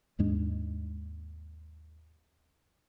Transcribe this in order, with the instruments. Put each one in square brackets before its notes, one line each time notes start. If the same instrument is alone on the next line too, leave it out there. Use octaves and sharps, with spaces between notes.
[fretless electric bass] D#2 G#2 G#3 D4